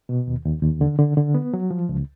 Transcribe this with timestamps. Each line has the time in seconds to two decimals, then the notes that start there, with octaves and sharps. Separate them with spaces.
0.09 B2
0.28 D#2
0.46 D#2
0.63 D#2
0.81 D3
0.99 D3
1.17 D3
1.34 B3
1.54 F#3
1.71 F3
1.89 C#2